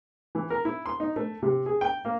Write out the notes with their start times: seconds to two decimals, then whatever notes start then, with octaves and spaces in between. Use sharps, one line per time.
0.35 E3
0.50 A#4
0.65 E4
0.86 C6
1.00 D#4
1.16 A3
1.43 C3
1.66 G#4
1.81 G5
2.05 A#3